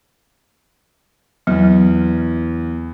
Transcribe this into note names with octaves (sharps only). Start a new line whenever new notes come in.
E2 F#3